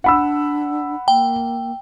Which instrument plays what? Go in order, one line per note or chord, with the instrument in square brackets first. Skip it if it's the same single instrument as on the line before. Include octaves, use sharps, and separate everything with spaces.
[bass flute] D4 [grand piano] F#5 B5 E6
[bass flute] A#3 [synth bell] G5